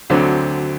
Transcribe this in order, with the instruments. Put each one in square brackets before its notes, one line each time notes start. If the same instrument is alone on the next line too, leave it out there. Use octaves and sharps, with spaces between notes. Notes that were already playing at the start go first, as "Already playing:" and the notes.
[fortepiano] D2 D3 F#3 C4